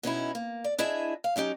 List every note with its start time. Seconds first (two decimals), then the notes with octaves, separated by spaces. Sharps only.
0.03 B2 C#4 D#4 E4
0.35 A#3
0.64 D5
0.78 D4 E4 G#4 D#5 E5
1.24 F5
1.36 F#3 C#4 D#4 G4